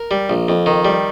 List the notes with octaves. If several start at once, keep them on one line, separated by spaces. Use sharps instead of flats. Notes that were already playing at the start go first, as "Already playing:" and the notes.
Already playing: A#4
G3
A#1
F2
D#3
G3